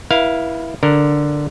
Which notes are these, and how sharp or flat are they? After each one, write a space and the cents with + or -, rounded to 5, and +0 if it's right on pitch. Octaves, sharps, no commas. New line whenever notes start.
E4 +0 B4 -40 F5 +0
D3 +0 A#4 +0